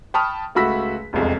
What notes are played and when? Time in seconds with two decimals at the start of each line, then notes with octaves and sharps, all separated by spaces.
0.14 G5 A5 B5 C#6 D#6 F6
0.55 C#2 A3 F#4 B5 E6 B6
1.13 E1 C2 F2 G#3